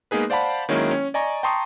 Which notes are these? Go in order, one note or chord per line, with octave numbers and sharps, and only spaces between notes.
G#3 A#3 B3 D#4 G#4 B4
C5 D5 F5 F#5 A5 B5
D#3 F#3 G#3 A#3 C#4 E4
C#4
D5 D#5 G#5 A#5 C#6
G5 A5 A#5 C6 C#6 D#6